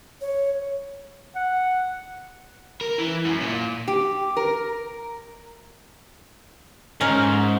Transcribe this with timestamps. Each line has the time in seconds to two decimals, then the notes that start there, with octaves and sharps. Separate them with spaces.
0.21 C#5
1.36 F#5
2.81 A#4
2.98 E3
3.25 F#2
3.41 A#2
3.88 G4
4.37 A#4
7.01 G#2 C#4 A#4